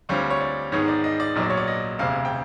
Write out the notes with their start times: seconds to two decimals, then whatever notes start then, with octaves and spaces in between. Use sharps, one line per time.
0.09 D2 D3 G3 C4 F4 C#5
0.30 C#5
0.40 D5
0.72 G#2 D#3 G#3 B3 D#4 C#5
0.88 D5
1.04 D#5
1.20 D5
1.35 A#1 A#2 F#3 B3 D#5
1.43 D5
1.50 C#5
1.57 D5
1.67 D#5
1.99 E1 D2 C3 F5
2.25 G5